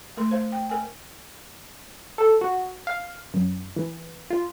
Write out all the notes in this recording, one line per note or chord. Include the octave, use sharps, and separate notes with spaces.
A3 A#4 C6
C5 F5
G5
A#4 G#5
A4
F#4
F5
F#2
E3
F4